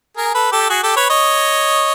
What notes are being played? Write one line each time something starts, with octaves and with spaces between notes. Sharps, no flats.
G#4 A#4
A4 B4
G4 A4
F#4 G#4
G4 A4
B4 C#5
C#5 D#5